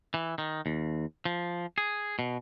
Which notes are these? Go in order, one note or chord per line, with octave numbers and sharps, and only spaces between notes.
E3
D#3
D#2
F3
G#4
B2